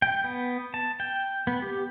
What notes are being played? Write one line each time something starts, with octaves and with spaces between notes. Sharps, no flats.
G5
B3
A5
G5
B3
G4